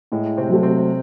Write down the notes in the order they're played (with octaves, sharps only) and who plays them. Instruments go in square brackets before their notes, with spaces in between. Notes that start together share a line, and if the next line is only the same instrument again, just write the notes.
[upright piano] A2 [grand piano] G#3
[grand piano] C3 C4
[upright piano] F#3 A3
[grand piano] C3 C4